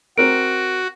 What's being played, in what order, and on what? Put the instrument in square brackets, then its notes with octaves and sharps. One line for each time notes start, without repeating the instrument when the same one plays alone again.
[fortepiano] C4 A#4 [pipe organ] F#4 [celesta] D7